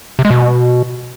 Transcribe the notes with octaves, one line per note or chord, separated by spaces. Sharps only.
C3
G#3
B2